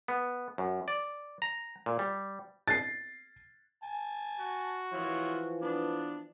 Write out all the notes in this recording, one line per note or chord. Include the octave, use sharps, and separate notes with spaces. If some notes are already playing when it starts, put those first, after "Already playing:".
B3
F#2
D5
A#5
A#2
G3
A6 C7
G#5 A5
F#4
E3 F3 E4 F4 C#5
B3 D4